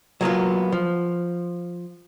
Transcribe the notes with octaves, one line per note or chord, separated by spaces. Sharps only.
F#3 A#3 B3 F4
F3